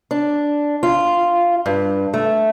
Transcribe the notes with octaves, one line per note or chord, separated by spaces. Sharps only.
D4
F4
G2
A3